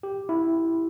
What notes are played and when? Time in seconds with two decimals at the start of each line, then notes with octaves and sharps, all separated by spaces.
0.03 G4
0.29 E4